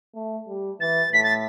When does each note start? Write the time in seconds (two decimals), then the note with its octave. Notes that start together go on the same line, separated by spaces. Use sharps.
0.15 A3
0.48 G3
0.80 E3 A6
1.13 A2 B6
1.23 A6